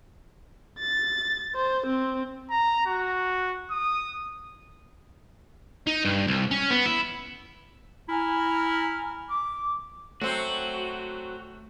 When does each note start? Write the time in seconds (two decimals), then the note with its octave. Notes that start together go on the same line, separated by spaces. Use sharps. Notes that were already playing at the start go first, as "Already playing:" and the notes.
0.79 A6
1.55 C5
1.87 C4
2.50 A#5
2.86 F#4
3.71 D#6
5.87 D#4
6.05 G2
6.27 C2
6.51 C#4
6.71 B3
6.86 E4
8.09 E4 G#5 A#5 F6
9.28 D6
10.21 F#3 A3 C4 F#4